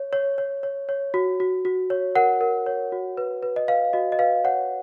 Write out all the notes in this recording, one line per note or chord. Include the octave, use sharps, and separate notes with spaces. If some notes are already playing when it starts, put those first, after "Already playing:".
Already playing: C#5
C#5
C#5
C#5
C#5
F#4
F#4
F#4
C#5
A#4 F#5
A#4
C#5
F#4
B4
B4
D#5
B4 F5
F#4 D#5
D#5
B4 F5
C#5 F#5